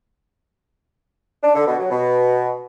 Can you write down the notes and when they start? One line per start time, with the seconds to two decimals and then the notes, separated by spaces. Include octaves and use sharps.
1.43 D4
1.55 D3
1.67 B2
1.78 F#3
1.90 B2